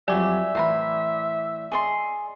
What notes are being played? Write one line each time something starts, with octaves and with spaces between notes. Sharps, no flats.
F2 F#3 G3 D5 E5 G#5 D6
A2 E3 C5 A#5 B5
G#4 D#5 A5 C6 C#6